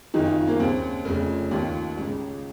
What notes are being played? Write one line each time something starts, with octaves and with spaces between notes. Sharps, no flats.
F#1 F2 D#3 D#4
F4
A#3
D#2 C#3 C4
F1 F2 C#3
D#2 D#3 F4
C#2 C#3